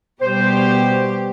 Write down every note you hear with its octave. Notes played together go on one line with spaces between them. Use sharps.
B2 G3 G4 C5